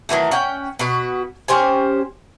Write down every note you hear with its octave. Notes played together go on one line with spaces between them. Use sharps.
D#3 E3 F#3 A3
C#4 F#5 G5
B2 F#4 B4
C#4 G4 C5 G#5